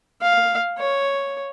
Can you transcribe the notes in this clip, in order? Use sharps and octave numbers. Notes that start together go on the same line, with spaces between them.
F5
C#5